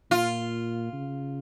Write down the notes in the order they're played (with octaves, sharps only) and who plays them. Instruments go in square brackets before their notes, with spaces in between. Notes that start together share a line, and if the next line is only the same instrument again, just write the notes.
[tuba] A#2 [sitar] F4
[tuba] C#3